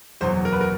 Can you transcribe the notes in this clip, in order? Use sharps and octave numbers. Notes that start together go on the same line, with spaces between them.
F#1 E2 B2 F#3 C5
A#4
B4
A#4